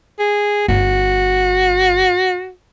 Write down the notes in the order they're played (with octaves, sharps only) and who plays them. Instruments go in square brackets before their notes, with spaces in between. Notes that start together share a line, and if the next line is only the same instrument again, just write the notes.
[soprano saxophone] G#4
[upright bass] G1 [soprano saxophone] F#4